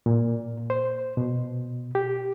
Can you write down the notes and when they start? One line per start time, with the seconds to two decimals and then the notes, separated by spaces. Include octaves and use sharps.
0.06 A#2
0.70 C5
1.17 B2
1.95 G4